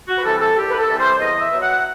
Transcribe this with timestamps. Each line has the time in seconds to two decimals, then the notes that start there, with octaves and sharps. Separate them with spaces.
0.08 F#4
0.18 B4
0.24 C3 E3 G3 A4
0.40 A4
0.56 C2 G4
0.69 B4
0.77 A4
0.87 C3 E3 G3
0.98 C5
1.19 E2 D#5
1.40 E5
1.51 B2 F#3
1.61 F#5